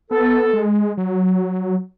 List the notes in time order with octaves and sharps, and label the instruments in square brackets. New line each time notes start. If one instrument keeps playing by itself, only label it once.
[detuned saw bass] B3 [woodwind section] A4
[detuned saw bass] G#3
F#3